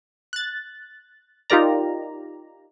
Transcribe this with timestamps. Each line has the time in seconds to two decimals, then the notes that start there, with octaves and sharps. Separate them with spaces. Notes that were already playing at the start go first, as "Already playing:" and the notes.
0.33 F#6 A6
1.50 D#4 F4 G4 A#4 D5 A#5